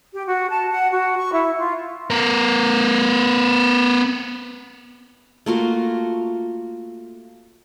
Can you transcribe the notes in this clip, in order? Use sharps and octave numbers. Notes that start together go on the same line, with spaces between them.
G4
F#4
A5
F#5
F#4
C#6
E4
F4
B3 A#4
A3 A#3 F4 F#4